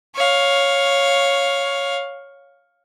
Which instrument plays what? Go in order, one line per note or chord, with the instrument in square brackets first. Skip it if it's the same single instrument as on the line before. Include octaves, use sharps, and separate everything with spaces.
[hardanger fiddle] C#5 F5